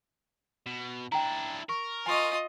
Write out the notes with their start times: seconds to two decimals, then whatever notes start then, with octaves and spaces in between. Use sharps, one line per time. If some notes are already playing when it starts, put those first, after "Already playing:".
0.67 B2
1.12 D4 E4 G5 A#5
1.69 A#4 C#6
2.06 F4 D#5 G#5 C6 C#6